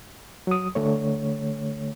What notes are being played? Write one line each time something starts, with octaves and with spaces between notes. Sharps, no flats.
F#3 D#6
D3 A3 C#5